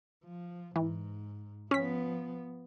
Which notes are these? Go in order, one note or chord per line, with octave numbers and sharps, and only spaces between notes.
F3
G#2 E3
F3 B3 C#4 B6